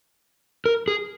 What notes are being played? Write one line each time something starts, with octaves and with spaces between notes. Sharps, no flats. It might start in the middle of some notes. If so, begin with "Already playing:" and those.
A#4
G#4